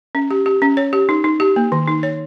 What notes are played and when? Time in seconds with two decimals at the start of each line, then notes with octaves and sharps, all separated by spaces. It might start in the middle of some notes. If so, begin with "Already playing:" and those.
0.15 C#4
0.31 G4
0.46 G4
0.62 C#4
0.77 C#5
0.93 G4
1.09 D#4
1.24 D#4
1.40 G4
1.56 A#3
1.72 D#3
1.88 D#4
2.03 C#5